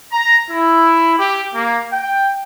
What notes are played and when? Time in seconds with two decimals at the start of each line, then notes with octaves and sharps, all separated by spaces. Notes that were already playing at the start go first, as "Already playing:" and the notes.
0.11 A#5
0.49 E4
1.19 G4
1.54 A#3
1.92 G5